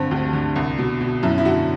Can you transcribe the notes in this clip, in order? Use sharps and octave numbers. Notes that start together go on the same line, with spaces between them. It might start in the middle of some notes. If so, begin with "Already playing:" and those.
Already playing: G2 D3 C4
D2
D3
C2
B2
B2
F#2 E4
E4
D3 F#4